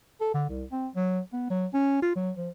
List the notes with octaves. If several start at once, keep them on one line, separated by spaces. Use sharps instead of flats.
A4
D3
C2
C4
F#3
B3
F#3
C#4
F4
F#3
F3